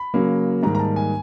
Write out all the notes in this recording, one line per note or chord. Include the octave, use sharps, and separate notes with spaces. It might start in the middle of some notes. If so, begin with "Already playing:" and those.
Already playing: B5
C#3 F#3 A#3
G#2 D#3 G3 A#3 A#5
A#5
A5
G#5